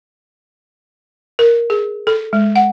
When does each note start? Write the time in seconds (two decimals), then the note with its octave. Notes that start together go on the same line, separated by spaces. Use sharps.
1.39 A#4
1.70 G#4
2.07 A4
2.33 G#3
2.56 F#5